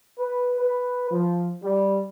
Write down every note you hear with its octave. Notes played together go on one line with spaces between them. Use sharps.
B4
B4
F3
G3